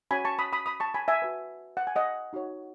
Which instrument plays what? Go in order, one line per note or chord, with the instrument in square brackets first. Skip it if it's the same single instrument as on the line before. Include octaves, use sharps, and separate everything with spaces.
[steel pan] C#4 F#4 C#5 G#5 B5
A5 C#6
B5 D#6
B5 D#6
B5 D#6
A5 C#6
G#5 B5
E5 G#5
F#4 B4
F#5
G#5
D#5 F#5
D#4 F#4 C#5